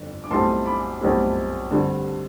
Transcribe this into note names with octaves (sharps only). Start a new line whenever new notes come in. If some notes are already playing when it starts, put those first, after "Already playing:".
Already playing: G1 F2 D3
D6
B1 A2 G3 C4 A5 C6
B5 D6
B1 A2 G3 C4
G2 D3 G3 C4